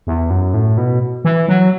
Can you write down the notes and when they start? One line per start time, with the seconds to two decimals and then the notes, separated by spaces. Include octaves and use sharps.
0.07 E2
0.30 F#2
0.54 A2
0.78 B2
1.25 E3
1.48 F#3